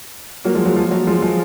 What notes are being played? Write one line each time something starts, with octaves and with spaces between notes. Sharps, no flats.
F#3 A#3
F3 G#3
F#3
F3
F#3
F3 G#3
F3 G#3